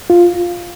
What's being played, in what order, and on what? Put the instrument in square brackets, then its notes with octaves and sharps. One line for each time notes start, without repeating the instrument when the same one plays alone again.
[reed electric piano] F4